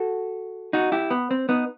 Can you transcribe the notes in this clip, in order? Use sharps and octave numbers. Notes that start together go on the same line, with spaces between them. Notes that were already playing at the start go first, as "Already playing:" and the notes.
Already playing: F#4 A4
D#4 F#4
E4 G4
B3
C4
B3 D#4